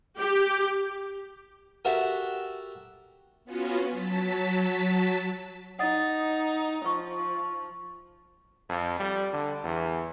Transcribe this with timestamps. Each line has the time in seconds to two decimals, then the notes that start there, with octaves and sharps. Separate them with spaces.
0.18 G4
1.85 F#4 G4 A4 A#4 E5 F#5
3.45 B3 C#4 F4 F#4
3.91 F#3 A5 B6
5.79 D#4 F#5 D#6 A6
6.86 F3 C#6
8.69 F2
9.00 G3
9.33 D3
9.64 E2